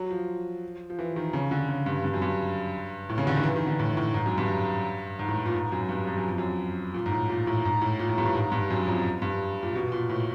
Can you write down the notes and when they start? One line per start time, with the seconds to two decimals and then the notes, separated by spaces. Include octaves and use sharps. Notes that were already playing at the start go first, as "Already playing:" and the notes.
Already playing: F#3
0.11 F3
0.90 F3
0.99 E3
1.16 D#3
1.33 C#3
1.51 D3
1.69 C#3
1.86 G2
2.04 G2
2.14 F#2
2.22 G2
3.09 A2
3.18 C#3
3.27 D3
3.35 D#3
3.44 E3
3.56 D#3
3.67 D3
3.79 A2
3.97 A2
4.14 G#2
4.26 F#2
4.38 G2
5.19 G#2
5.28 A2
5.46 A#2
5.54 G#2
5.72 F#2
5.89 G2
6.07 G2
6.17 F#2
6.28 F2
6.38 F#2
6.94 A#2
7.06 G#2
7.12 A2
7.29 A#2
7.47 A2
7.65 G#2
7.81 A2
7.99 A#2
8.09 A2
8.18 G2
8.25 A2
8.35 G#2
8.52 G2
8.70 F#2
8.87 F2
9.22 G2
9.63 A#2
9.75 B2
9.92 A#2
10.09 A2